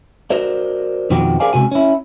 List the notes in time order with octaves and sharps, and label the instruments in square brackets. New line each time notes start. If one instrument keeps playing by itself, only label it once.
[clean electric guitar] F#4 A#4 C5 D5
F2 B2 D#3 F3 F#4 G4
G#4 A#4 C5 D5 F5 G#5
C#2 G2 C3 F#4 G#5
C#4 E4